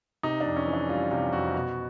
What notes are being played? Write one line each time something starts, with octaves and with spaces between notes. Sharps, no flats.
C3 D#4
D4
F2
C#4
E3
D4
G3 F4
C3 F4
F2 F#4
B2